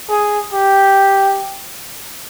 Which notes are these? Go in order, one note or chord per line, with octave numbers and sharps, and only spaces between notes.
G#4
G4